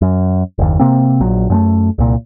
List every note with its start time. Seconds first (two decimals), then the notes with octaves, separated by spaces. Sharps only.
0.02 F#2
0.59 F#1 D#2
0.79 C3 A#3 C4
1.20 A#1 F#3
1.50 F#2 G#3 A3
1.98 C2 A#2